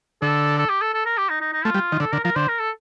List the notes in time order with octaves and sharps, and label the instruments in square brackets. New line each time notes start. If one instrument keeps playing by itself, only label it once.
[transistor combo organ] D3 [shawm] A4
[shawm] A4
G4
A4
A4
A#4
G4
D#4
D#4
D#4
[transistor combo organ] A3 [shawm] F4
[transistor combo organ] G3
D#3
[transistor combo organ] D3 [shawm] A4
[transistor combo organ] D3 [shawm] A#4
[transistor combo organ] F3 [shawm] A#4
[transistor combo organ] D3 [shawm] C5
[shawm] A#4
A4